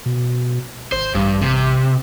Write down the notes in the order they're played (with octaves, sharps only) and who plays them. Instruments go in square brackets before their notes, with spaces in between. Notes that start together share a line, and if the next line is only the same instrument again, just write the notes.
[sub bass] B2
[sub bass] G#1 [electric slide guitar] C5
[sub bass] A1 [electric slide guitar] G2
[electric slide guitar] C3